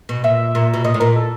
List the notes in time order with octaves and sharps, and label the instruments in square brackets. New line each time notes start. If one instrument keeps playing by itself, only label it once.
[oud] B2
[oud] A#2 [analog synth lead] E5
[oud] A#2
B2
[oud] A#2 [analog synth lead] D#5
[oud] A2
[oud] A#2 [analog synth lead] A#4
[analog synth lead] A4